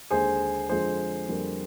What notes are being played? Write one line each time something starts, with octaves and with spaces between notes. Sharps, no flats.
D#2 D3 G#3 G#4 C5
F2 D3 F3 G#3 G#4 C5
F2 D3 G3 A#3